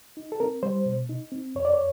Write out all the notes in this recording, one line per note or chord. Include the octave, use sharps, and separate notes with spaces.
D#4
A4
C4 A#4
G3 C5
B2
D#4
C4
F2 C#5
D5
C#5